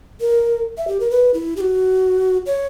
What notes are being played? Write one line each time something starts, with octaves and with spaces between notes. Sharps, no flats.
A#4
E5
G4
A#4
B4
E4
G4
F#4
C#5